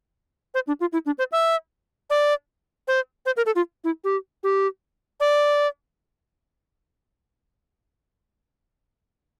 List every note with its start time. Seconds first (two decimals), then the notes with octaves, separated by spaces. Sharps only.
0.54 C5
0.67 D4
0.80 F4
0.93 E4
1.06 D4
1.18 C5
1.32 E5
2.10 D5
2.88 C5
3.26 C5
3.37 A#4
3.46 A4
3.56 F4
3.84 E4
4.04 G4
4.43 G4
5.20 D5